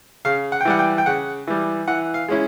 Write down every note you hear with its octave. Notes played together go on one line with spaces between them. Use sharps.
C#3 F5
F#5
G5
E3 G3 F#5
G5
G5
C#3 F#5
E3 G3
E3 F#5
F5
G#3 C#4 E4